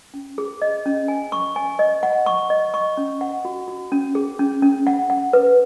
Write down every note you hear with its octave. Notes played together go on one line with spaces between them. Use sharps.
C#4
G#4
D#5
C#4
G#5
C#6
G#5
D#5
F#5
C#6
D#5
C#6
C#4
F#5
F#4
F#4
C#4
G#4
C#4
C#4
F#5
F#5
B4